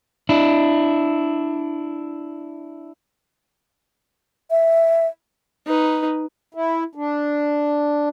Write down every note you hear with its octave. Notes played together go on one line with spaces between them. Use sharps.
D4 E4
E5
D#4 B4
E4
D4